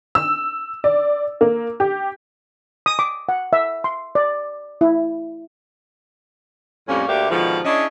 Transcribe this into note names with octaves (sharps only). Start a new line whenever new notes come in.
E6
D5
A#3
G4
D#6
D6
F#5
E5
C6
D5
E4
F2 A2 G3 A#3 C#4
D2 D3 A#3 D4 G4 E5
G#2 B2 D3 D#3 F3
C#4 D4 E4 G#4 C#5 D#5